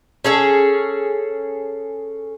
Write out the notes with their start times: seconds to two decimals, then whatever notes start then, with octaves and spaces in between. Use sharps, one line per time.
0.24 C#4 G#4 A4